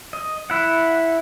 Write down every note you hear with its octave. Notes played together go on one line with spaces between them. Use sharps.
D#5
E4 F#5